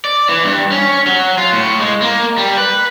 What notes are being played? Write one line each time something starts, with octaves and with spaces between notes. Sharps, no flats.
D5
E3
G2
C#4
F#3
F4
A2
G#3
A#3
G3
B4